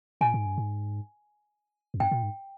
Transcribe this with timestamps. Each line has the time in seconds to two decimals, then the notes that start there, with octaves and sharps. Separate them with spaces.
0.21 A#2 G#5
0.34 G#2
0.46 G2
0.58 G#2
1.94 F2
2.00 G2 G5
2.11 A#2
2.23 G#2